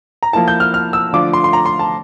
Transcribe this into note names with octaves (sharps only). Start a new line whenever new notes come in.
A#5
F3 A#3 E4 A5
G6
F6
F6
E6
D3 F3 A3 D4 F4 D6
C6
C6
A#5
C6
A5